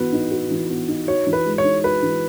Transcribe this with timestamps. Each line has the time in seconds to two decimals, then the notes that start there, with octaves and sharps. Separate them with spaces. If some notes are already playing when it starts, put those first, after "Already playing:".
Already playing: E3 B3 F#4 B4
0.12 D#4
0.31 F#4
0.51 E3
0.70 B3
0.88 D#4
1.08 F#4 C#5
1.27 E3
1.33 B4
1.45 G#3
1.58 C#5
1.64 D#4
1.83 F#4 B4
2.02 E3